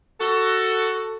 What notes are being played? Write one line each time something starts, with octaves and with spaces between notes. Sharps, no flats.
F#4 A4